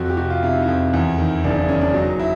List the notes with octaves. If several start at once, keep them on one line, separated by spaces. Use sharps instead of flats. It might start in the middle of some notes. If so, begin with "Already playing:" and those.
Already playing: F2 F#4
G4
C3 F#4
F4
C3 E4
D#4
E4
F2
E2
D#3
F#1 D4
D4
D#3 C#4
D4
F#3 D#4
E4